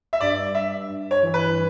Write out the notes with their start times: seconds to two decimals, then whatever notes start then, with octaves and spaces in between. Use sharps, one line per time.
0.13 E5
0.21 G2 D5
0.55 G2 E5
0.89 G2
1.11 C#5
1.23 E3
1.34 B4